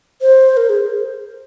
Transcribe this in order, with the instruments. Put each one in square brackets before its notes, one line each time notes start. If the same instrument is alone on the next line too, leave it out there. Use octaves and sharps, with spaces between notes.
[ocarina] C5
A#4
G#4